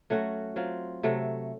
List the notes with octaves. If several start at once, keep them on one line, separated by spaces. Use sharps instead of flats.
F#3 A3 C#4 F#4
F#3 C4 F4
C3 F#3 A3